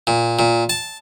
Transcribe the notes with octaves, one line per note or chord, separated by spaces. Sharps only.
A#2
A#2
A5